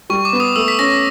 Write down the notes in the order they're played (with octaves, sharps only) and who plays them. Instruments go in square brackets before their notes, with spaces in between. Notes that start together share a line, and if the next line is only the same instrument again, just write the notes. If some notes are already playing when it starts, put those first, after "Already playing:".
[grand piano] G3 [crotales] C#6
[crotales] D6
[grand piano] B3
[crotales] D#6
[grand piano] A3 [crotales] E6
[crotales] B6
[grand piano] C#4 [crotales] A#6